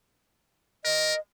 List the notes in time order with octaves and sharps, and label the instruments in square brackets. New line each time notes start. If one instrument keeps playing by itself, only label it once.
[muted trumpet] A#4 [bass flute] D#5